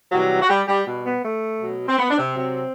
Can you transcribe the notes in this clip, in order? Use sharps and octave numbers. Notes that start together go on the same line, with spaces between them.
C3 E3 F#3 G3 F#4
F#4
G3 G4
G3 G4
B2 G3
B3
A3
B2 F#3
C4
B3
D4
C3 C4
C3 F#3